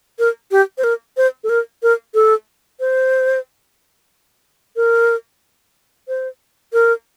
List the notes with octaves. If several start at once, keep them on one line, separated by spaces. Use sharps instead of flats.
A#4
G4
C5
A#4
C5
A4
A#4
A#4
A4
C5
A#4
C5
A#4